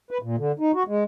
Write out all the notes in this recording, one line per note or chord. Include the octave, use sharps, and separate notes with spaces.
B4
A#2
D3
D#4
F#4
G#3